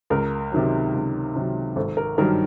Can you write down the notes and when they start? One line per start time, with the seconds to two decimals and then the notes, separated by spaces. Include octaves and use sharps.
0.10 C#2 A#4
0.52 C3 D#3 F#3
0.94 C#2
1.36 C3 D#3 F#3
1.76 G#1 A4
1.97 A#4
2.18 G2 D#3 F#3 A#4